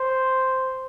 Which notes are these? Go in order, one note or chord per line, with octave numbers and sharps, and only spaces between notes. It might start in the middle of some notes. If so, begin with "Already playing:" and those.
Already playing: C5